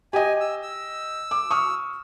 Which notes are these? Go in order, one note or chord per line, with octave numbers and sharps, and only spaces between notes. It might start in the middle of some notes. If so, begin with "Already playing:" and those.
G4 D#5 G#5
E6
E6
D6
C#6 D#6 F6